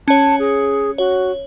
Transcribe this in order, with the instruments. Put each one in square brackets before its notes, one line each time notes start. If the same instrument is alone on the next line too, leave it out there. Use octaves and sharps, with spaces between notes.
[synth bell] C#4 C#5 [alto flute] A5
[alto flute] G#4
[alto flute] F#4 [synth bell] C#5